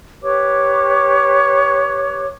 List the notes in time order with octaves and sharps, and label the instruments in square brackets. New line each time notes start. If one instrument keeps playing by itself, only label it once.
[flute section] G4 B4 C#5 D6